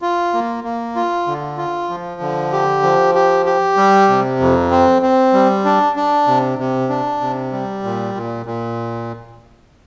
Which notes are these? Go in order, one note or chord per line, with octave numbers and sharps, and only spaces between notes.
F4
A#3
A#3
F4
D3
F4
F3
D3
G4
F3
G4
G4
G3
C3
F2
C4
C4
G3
D4
D4
C3
C3
D4
C3
G3
A#2
A#2
A#2